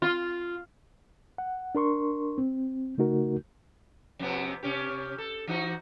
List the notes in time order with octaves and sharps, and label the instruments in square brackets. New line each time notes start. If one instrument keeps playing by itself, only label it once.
[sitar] F4
[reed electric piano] F#5
D4 A#4 C6 C#6
C4
C#3 A3 D#4 F#4 A#4
[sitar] F2 C3 B3
C3 C#4 G4
A4
E3 D#4 F#4